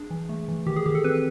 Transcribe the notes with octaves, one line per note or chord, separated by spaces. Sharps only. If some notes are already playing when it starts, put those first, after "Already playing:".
Already playing: D4 G#4
E3
A3
E3
D#3 G4
G#4
D#3 G4
A4
C4 B4